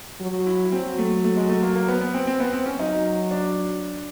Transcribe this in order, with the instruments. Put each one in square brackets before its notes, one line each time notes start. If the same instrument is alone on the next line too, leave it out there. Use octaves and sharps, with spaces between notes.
[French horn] F#3
[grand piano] E4
[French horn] F#3 [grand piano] C4
[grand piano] A3
A3
G#3
A3
A#3
A#3
B3
B3
C4
C4
B3
C4
C#4
[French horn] F#3 [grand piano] D#4
[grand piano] D4